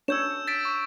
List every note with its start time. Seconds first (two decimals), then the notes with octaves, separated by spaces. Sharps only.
0.08 D4 C#5 E6 G6 E7
0.47 A6 B6 D7
0.65 C#6